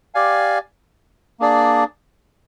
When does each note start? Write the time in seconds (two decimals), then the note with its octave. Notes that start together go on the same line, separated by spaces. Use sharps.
0.15 G4 D5 F5 G#5
1.40 A#3 D4 G#4 D5